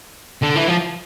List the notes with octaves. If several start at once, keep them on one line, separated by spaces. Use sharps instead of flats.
D3
E3
F3